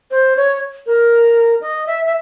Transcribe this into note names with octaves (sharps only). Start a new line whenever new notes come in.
C5
C#5
A#4
D#5
E5
E5